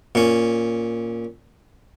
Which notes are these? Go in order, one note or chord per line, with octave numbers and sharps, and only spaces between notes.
A#2 C#4